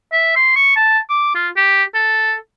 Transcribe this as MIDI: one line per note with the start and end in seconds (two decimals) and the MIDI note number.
0.12 0.33 76
0.36 0.51 84
0.56 0.74 85
0.76 0.99 81
1.10 1.30 86
1.35 1.49 65
1.56 1.83 67
1.95 2.35 69